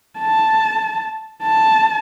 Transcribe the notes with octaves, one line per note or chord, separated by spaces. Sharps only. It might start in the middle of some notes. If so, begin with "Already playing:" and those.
A5
A5